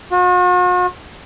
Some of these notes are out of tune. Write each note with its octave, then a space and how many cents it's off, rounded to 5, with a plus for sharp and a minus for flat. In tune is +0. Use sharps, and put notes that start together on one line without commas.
F#4 -45